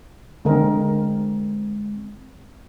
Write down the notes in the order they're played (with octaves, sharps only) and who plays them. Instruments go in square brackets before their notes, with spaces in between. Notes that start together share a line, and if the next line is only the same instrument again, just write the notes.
[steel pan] D3 A#4 [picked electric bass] G#3 A3 C4